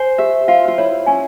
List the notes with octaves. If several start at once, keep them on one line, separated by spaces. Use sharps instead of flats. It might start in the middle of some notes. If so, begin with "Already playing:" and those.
Already playing: C5 G#5
G4 E5
F4 F5
F4
E4 C#5
C#4 G#5